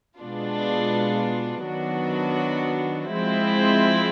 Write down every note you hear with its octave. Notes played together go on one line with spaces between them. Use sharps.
B2 G#3 B3 D4 F4
D#3 F#3 B3 D4 F#4
F3 G#3 C4 E4